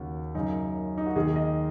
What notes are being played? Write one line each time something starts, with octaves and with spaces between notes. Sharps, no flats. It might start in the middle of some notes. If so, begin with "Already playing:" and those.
Already playing: D#2 C#3 F#4
F#2 C#3 D#4
D#4
F#4
D#2 D#3 G#4
D#5